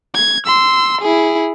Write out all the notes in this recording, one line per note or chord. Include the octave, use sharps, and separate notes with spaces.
G#6
C6 E6
E4 G#4